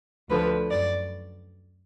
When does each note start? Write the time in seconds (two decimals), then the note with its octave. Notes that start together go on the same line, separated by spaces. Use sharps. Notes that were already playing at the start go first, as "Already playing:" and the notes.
0.30 D2 D3 F3 B4
0.71 F#2 D5